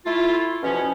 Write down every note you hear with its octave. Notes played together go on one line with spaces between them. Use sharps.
A3 E4 F4
E2 B2 F3 C#4